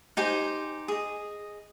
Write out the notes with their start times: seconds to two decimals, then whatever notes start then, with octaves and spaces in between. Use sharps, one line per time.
0.17 D#4 G4 C5 G#5
0.88 G#4 D#5